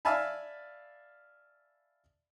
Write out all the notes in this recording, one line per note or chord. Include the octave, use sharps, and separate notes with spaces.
D5 E5 F5 G#5 A5 B5